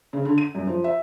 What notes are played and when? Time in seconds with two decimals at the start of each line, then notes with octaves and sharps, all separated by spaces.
0.13 C#3
0.25 D3
0.38 D#7
0.55 F#2
0.67 F3
0.84 E5